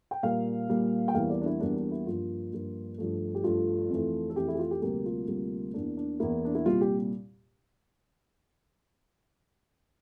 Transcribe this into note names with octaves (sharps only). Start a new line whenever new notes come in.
G5
A#2 G3 A#3 F5
A#2 G3 A#3
G5
E2 E3 G3 A#3 F5
D5
D4
E4
E2 E3 G3 A#3 D4
D4
E4
G2 F3 A#3 F4
G2 F3 A#3
G2 F3 A3
G4
G2 F3 A3 F4
F2 E3 A3
A4
F2 E3 A3 G4
E4
G4
F4
G4
D2 C3 G3 A#3 G4
F4
D2 C3 G3 A#3
E2 E3 A#3 D4
D4
E2 E3 A#3 E4
D4
E4
C2 A#2 G3 F4
G4